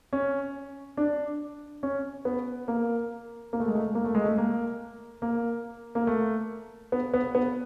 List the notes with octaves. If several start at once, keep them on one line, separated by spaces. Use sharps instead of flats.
C#4
D4
C#4
B3
A#3
A#3
A3
G#3
A3
A#3
A3
G#3
A3
A#3
A#3
A#3
A3
B3
B3
B3